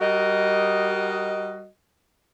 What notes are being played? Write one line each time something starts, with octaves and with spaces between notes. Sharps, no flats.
G3 F#4 A#4 D#5